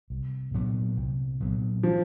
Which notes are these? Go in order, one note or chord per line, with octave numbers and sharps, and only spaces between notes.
C2
A#2 F#3 B3
C2
A#2 F#3 B3
F3